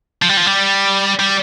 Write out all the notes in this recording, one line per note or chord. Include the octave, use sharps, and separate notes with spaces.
F3
G3
F3
G3
G3